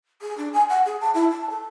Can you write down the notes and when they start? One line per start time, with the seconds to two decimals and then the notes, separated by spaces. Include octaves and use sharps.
0.22 G#4
0.37 D4
0.53 G#5
0.69 F#5
0.86 G#4
1.01 A5
1.14 E4
1.31 A5
1.50 A4